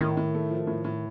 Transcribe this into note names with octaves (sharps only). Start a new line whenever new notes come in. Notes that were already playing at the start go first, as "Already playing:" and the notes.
A2 D#3
A2
A3
F3
A2
A2